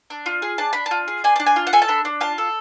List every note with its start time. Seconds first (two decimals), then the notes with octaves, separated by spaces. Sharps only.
0.10 D4
0.26 F4
0.42 G#4
0.58 D4 A5
0.73 D4 B5
0.86 A5
0.91 F4
1.08 G#4
1.24 D4 G#5
1.36 D4 A5
1.46 G#5
1.56 F4
1.67 F#5
1.73 A4 G#5
1.82 A5
1.88 D4 B5
2.05 D4
2.21 F4 A5
2.38 A4